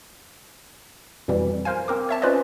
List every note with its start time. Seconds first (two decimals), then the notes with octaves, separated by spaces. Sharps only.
1.28 F2 B2 E3 G3
1.65 A#4 C5 F5 G#5
1.88 C4 A#4 D6
2.09 C#5 E5 A5
2.22 C#4 F4 B4 C5 D5 D#5